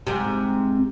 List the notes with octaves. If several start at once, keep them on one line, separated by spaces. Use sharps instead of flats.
G#2 C3